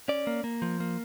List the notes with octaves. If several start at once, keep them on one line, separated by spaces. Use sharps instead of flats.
C#4 D5
A#3
A#3
F3
A#3